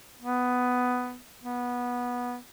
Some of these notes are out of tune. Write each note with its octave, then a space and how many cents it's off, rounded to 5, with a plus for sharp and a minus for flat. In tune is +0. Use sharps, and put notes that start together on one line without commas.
B3 +10
B3 -15